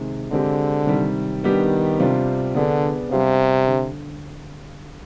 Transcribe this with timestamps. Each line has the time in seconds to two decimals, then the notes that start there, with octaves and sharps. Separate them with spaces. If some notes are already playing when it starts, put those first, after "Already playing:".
Already playing: C3 D#3 G#3
0.32 D3 G#3 C4 G4
0.87 C3 D#3 G3
1.43 D#3 G3 B3 D4 G4
1.99 C3 G3 D4 F4 C5
2.55 D3 B3 D4 G#4
3.11 C3 G3 D4 G4 C5 F5
3.67 D3